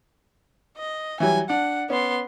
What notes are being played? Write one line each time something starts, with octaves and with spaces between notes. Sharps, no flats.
D#5
E3 F#3 G3 G#5
D4 F#5
B3 C#4 C6